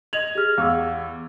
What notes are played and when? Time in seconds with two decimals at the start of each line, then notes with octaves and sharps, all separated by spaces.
0.13 D#5 G#6 F7 F#7
0.35 G4 G#4 F6
0.58 E2 F5 C#6 E6